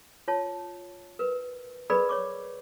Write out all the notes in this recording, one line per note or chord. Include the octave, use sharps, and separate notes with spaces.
F4 C#5 A5
A#4 B4
G#4 A#4 B4 D5 B5
C#5 C#6 D6